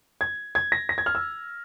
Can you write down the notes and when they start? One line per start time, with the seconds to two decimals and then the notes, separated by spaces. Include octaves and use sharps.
0.21 G#6
0.55 G#6
0.72 A#6
0.89 A#6
0.98 G#6
1.06 F6
1.15 E6